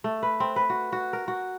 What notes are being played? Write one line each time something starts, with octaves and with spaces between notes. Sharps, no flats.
A3
B4
C4
B4
F#4
F#4
A#4
F#4